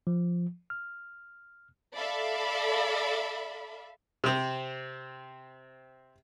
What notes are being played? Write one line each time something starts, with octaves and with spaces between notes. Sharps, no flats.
F3
F6
A4 D5 E5 F5 B5
C3 C4